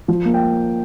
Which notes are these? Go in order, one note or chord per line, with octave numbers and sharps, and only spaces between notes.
F3
A#3
G5